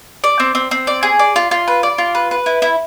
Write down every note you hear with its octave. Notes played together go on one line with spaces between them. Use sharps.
D5
C4
C4
C4
D5
G#4
D5
F4
F4
B4
D5
F4
B4
B4
E4
E4